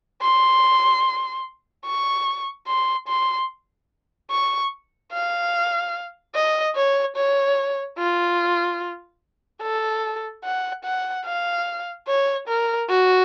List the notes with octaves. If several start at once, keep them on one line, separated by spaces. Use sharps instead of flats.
C6
C#6
C6
C6
C#6
F5
D#5
C#5
C#5
F4
A4
F#5
F#5
F5
C#5
A#4
F#4